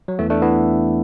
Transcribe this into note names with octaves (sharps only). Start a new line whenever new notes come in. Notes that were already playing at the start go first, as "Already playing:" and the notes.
F#3
E2 E3 A3
A3 D4
B3 E4